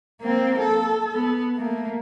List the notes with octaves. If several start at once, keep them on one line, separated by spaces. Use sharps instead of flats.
A#3 C4
A4
B3
A3 A#3